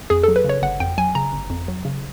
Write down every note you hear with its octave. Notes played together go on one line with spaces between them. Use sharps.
F2 G#4
A4
F#3
B4
C#3 C#5
G1 F#5
F2 G5
F#3 G#5
C#3 A#5
G1
F2
F#3
C#3